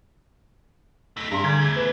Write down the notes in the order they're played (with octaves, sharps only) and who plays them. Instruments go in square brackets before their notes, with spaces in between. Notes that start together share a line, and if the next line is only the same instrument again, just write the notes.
[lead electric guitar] A3 D#4 [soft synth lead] B6
[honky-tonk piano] G2 C6 [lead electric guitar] E4 A#4
[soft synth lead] D3 [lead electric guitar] G3 [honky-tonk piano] G#4 A#5 G#6
[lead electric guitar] E2 A3
[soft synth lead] B4